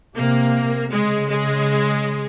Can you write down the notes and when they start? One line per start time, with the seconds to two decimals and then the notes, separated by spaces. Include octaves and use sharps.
0.15 C3 A#3
0.90 C#3 G#3
1.28 G#3